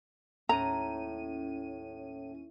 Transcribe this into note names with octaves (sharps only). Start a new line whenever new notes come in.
D#2 A2 C#4 A#5 D#7